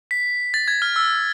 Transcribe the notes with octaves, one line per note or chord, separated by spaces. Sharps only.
B6
A6
G#6
F6
E6